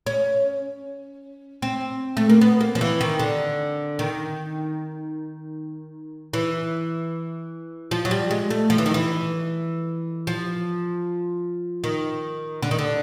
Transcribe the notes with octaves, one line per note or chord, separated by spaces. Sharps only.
C#4
C4
A3
A#3
B3
A#3
F3
E3
D#3
D3
D#3
E3
F3
F#3
G3
G#3
A3
F3
E3
D#3
E3
F3
D#3
D3
D#3
D3